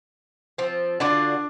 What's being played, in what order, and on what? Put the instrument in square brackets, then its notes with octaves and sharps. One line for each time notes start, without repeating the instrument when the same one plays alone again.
[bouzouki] F3 C4
[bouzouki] D3 F4 F#4 [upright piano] D4 D5